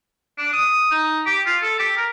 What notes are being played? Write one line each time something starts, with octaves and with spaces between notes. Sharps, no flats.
D4
D#6
D#4
G4
F4
A4
G4
A#4